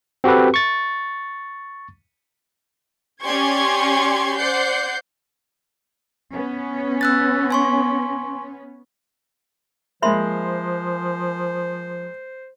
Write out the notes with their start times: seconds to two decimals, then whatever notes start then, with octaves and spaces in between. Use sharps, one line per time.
0.24 C4 F#4 G4 A4 B4
0.54 C#6 A6
3.23 C#4 G4 D5 C6 C#6 G#6
4.37 C5 D5 F#5 G6 C7
6.34 B3 C#4
7.01 E6 F#6 A6
7.51 G#5 C6 C#6
10.02 F3 G#3 A#3 C5 E5 B5 C6